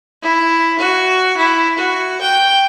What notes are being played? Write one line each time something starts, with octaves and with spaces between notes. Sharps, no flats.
E4
F#4
E4
F#4
G5